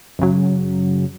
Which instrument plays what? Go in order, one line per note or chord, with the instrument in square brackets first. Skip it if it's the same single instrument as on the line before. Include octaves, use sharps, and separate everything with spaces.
[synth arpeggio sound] F#2 C#3 F#3